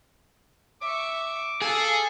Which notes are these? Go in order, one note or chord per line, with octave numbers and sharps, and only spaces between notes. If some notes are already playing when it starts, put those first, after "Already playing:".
E5 C#6 D6
G#4 A4 F5